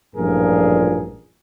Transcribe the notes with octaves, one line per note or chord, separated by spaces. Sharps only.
A1 G2 A#2 F3 G#4 A#4